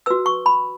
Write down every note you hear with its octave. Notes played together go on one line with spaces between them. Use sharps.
F#4 B4 E6
C#6
B5